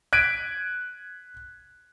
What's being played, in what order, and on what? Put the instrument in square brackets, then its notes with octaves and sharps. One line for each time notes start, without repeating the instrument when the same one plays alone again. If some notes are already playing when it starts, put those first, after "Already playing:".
[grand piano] F#6 G#6 B6 D7 D#7